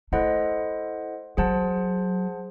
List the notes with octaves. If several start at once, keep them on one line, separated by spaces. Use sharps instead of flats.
A3 E4 A4 C5 D#5 F#5
F#3 G#4 C5 F#5 A5